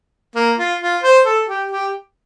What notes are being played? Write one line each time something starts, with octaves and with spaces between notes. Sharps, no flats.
A#3
F4
F4
C5
A4
G4
G4